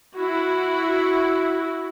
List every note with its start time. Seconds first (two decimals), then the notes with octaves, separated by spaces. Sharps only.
0.16 E4 F#4